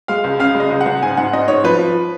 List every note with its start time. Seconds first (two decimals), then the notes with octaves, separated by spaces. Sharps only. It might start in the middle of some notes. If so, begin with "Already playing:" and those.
0.08 G#3 F5
0.24 C#2
0.39 C#3 F5
0.55 G#3
0.60 D#5
0.71 C#2
0.81 F#5
0.86 C#2
1.02 G#2 G#5
1.17 G#2 F#5
1.33 G#2 D#5
1.48 G#2 C#5
1.64 F3 B4
1.79 F3